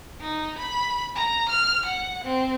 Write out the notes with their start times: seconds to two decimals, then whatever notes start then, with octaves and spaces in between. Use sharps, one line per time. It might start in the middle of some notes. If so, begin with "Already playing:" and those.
0.21 D#4
0.58 B5
1.15 A#5
1.49 F6
1.86 F#5
2.24 C4